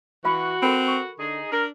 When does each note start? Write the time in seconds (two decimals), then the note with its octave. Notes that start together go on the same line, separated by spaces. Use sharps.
0.24 E3 F#4 B4 F5 B5
0.62 C4 A4 A#4 B5
0.88 C#6
1.19 D3 D#4 G#4
1.52 D4 A#4